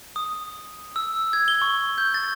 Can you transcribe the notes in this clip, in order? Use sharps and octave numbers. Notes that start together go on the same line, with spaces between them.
D#6
E6
G#6
G7
C#6
G6
A6